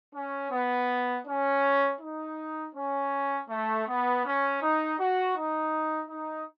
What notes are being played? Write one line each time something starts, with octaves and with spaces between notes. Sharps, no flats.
C#4
B3
C#4
D#4
C#4
A3
B3
C#4
D#4
F#4
D#4
D#4